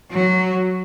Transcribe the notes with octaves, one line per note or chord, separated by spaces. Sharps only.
F#3